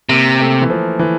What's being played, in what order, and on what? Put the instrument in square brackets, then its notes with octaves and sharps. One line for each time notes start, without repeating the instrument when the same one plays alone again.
[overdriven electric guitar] C3 [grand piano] A#3
[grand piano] A3
E3
F3
E3